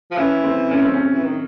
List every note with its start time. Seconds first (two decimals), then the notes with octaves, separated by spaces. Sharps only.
0.11 F3
0.17 E3 C#4
0.44 C4
0.71 C#4
0.82 C4
0.94 C#4
1.13 E3
1.24 D#3